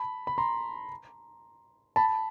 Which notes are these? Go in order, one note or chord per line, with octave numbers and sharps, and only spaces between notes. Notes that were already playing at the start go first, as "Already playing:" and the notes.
Already playing: A5 B5
B5
A#5 C6
A5 B5